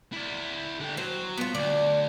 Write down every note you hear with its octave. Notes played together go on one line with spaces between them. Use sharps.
E4 D5
D3 G4
F#3 C5
B3 F4
D2 D5